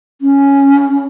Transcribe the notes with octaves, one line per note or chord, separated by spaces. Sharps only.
C#4